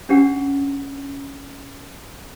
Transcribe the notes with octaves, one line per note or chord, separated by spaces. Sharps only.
C#4 D4 G4 F#5